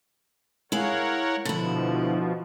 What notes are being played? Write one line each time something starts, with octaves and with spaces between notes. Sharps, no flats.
G#3 E4 A#4 C#5 F5 F#5
B2 D3 F3 E4